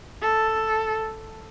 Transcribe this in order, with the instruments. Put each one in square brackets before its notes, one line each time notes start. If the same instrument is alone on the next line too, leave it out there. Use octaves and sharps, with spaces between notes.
[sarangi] A4